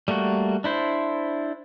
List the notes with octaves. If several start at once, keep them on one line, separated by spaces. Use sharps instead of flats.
G3 A3 A#3 F#4
D4 E4 C5